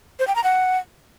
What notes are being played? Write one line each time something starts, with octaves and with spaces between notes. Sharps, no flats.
C5
G5
A#5
F#5